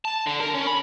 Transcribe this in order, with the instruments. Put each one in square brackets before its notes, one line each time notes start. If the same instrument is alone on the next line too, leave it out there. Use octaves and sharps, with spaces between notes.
[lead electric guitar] A5
D3
A#4
C#4
B5